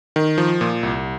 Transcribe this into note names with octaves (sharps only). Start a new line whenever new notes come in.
D#3
F3
A#2
C2